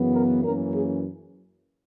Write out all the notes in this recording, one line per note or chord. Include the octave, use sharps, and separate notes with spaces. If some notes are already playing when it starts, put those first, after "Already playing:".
Already playing: F#2 C#3 E3 B3
A#4
F#2 E3 A#3 C#4 A#4
G#4